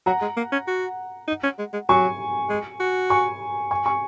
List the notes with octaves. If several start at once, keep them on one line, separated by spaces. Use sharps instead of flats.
F#3 F#5 A#5
G#3
A#3
C#4
F#4
D#4
C#4
G#3
G#3
F#3 G#5 C#6
G#3
F#4
G#5 C#6
G#5 C#6
G#5 C#6